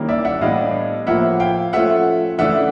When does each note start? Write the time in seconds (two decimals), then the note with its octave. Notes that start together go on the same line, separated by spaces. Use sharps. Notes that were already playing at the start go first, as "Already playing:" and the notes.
Already playing: D#3 G3 A#3 C#4 E4
0.08 D5 E5
0.25 E5 F#5
0.41 A2 E3 G3 B3 D4 D#5 F5
1.07 A2 F3 A#3 E5 F#5
1.40 F5 G5
1.73 F3 A3 C#4 F4 E5 F#5
2.38 C#3 E3 A3 D4 E5 F#5